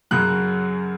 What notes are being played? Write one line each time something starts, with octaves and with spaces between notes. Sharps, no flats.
F#2 C#3 F#3 F#6